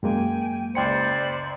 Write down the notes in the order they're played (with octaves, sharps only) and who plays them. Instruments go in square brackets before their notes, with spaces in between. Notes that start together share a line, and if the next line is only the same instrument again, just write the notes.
[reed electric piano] F#2 G#3 A#3 [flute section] G5 G#5
[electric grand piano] C#2 G5 C#7 [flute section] C5 D5 B5